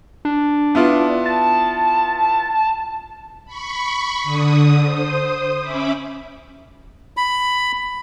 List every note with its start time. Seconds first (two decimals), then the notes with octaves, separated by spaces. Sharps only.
0.25 D4
0.75 B3 E4 F4
1.26 A5
3.46 B5 C#6
4.23 D3 D#6
4.84 C5 D#6
5.60 C#4 E5 B5 D6
7.17 B5